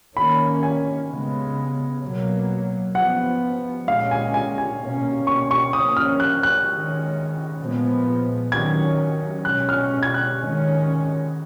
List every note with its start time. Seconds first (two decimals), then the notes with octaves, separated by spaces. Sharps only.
0.16 D#3 A#3 C#4 B5
0.63 G#5
1.10 C#3 G#3 B3
2.02 B2 F#3 A#3
2.95 F3 B3 F#5
3.88 A#2 G#3 C#4 F5
4.11 G#5
4.34 G#5
4.58 G#5
4.80 B2 A#3 C#4
5.27 C#6
5.51 C#6
5.73 F3 A#3 C#4 D#6
5.97 F6
6.20 F#6
6.43 F#6
6.66 D#3 G#3 C#4
7.59 A#2 F3 G#3 B3
8.52 D#3 F#3 C#4 G#6
9.45 B2 G#3 C#4 F#6
9.69 F6
10.03 G#6
10.14 F#6
10.38 D#3 G#3 C#4